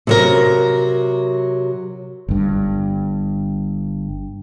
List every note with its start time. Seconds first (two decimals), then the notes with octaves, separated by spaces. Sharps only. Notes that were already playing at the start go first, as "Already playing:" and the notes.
0.07 C3 F#3 A#4
2.28 G1 G2